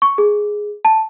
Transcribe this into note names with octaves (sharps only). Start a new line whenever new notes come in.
C#6
G#4
A5